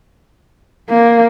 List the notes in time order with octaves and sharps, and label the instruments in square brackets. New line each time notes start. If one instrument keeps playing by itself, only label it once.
[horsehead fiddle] A#3